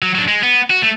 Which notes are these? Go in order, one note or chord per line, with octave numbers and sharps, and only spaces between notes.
F#3
F#3 D4
G#3
B3
F#4
A3